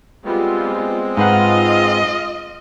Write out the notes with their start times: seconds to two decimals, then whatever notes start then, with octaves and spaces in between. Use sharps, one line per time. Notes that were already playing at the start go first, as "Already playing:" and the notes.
0.25 G3 G#3 B3 C4 F4
1.17 G#2 F4 B4 D#5 F5 F#5